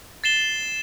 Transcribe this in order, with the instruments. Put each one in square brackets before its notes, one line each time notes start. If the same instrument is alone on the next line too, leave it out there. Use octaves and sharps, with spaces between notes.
[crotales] A6 C7 E7 G7